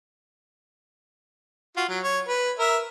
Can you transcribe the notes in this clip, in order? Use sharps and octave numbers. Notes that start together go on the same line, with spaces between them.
F4 F#4
F#3
C#5
B4
A#4 E5